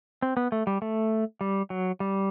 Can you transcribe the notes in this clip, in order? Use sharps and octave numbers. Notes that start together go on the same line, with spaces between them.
C4
B3
A3
G3
A3
G3
F#3
G3